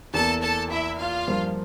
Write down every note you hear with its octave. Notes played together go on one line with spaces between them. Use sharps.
E2 E3 A#3 A4 A5
A4 A5
E4 E5
F4 F5
G2 F3 A#3